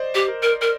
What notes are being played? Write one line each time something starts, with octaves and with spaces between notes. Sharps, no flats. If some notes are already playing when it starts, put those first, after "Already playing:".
Already playing: C5 D5 D#5
G4
A#4
A#4
A#4